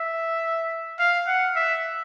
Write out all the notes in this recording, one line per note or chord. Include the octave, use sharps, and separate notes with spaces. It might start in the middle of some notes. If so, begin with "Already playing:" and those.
Already playing: E5
F5
F#5
E5